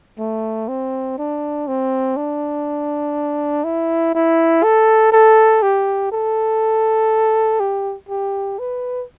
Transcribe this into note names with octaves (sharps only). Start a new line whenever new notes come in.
A3
C4
D4
C4
D4
E4
E4
A4
A4
G4
A4
G4
G4
B4